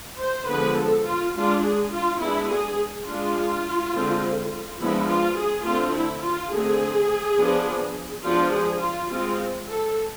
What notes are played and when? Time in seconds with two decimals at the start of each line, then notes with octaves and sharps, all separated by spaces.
0.20 C5
0.49 D3 F3 G#3 B3 B4
0.78 A4
1.06 F4
1.35 G#3 D4 F4
1.64 G#4
1.92 F4
2.21 G#3 B3 D4 E4
2.51 G#4
3.07 G#3 D4 F4
3.95 D3 G#3 C4
4.80 F3 G#3 B3 D4 E4
5.08 F4
5.38 G#4
5.66 D3 A3 C4 F4
5.95 E4
6.23 F4
6.52 D3 A3 C4 G#4
7.38 F3 B3 D4
8.24 F3 G#3 B3 D4 F4
8.53 G#4
8.82 F4
9.11 G#3 C4 F4
9.68 A4